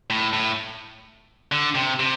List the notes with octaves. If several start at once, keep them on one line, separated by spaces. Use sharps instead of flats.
A2
A2
D3
C3
C3